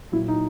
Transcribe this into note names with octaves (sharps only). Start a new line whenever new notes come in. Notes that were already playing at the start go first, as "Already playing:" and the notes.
A#2 F#3 E4
D#4